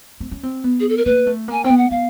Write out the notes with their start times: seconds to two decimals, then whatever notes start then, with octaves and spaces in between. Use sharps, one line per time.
0.20 C4
0.31 C#4
0.43 C4
0.64 B3
0.80 G#4
0.89 A4
0.97 A#4
1.05 A#3 B4
1.26 A3
1.48 A#3 G#5
1.64 C4 G5
1.70 B3
1.78 F#5
1.90 B3 F5